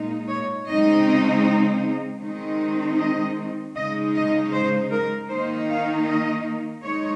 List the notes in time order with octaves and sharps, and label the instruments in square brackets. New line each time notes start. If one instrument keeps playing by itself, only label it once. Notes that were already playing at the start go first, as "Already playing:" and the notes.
Already playing: [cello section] A#2 G#3 D#4
C#5
C#3 G#3 C4 D#4 D#5
D#3 G#3 C4 D#4
D#5
C#3 G#3 D#4 D#5
D#5
C5
A#4
D#3 A#3 D#4 C5
F5
D#5
G#3 D#4 C#5